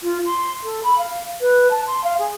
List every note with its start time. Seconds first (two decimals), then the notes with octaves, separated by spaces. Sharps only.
0.02 F4
0.25 C6
0.63 A4
0.83 B5
0.98 F5
1.41 B4
1.70 A5
1.87 C6
2.03 F5
2.19 G#4